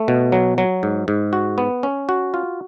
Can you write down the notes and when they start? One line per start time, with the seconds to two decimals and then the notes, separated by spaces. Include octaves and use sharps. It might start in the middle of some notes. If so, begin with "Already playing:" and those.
Already playing: A3
0.08 B2
0.32 F#3
0.58 F#3
0.83 G#2
1.08 G#2
1.33 F#4
1.58 B3
1.83 C#4
2.09 F#4
2.34 F4